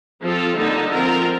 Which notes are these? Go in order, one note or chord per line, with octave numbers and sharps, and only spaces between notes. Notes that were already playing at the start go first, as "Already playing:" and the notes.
F3 C4 F4 A4
D3 G3 A#3 D#4 A4
F3 C4 F4 A#4